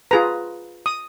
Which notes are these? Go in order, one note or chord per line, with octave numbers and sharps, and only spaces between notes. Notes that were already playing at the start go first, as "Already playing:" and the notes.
F4 G#4 B4 A#5
D#6